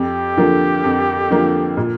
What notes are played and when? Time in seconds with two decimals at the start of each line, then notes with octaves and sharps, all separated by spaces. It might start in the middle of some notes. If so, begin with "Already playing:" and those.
Already playing: F2 G4
0.37 D3 F3 A#3
0.84 F2
1.30 D3 F3 A#3
1.77 A#2